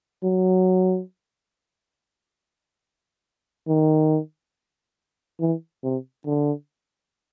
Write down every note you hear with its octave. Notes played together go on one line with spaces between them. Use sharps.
F#3
D#3
E3
C3
D3